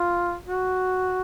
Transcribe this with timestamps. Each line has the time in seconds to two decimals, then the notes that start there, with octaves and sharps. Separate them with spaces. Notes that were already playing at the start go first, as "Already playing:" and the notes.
Already playing: F4
0.46 F#4